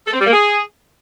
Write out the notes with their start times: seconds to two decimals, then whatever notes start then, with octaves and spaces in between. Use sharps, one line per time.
0.07 A4
0.13 C4
0.20 G3
0.27 A#3
0.33 G#4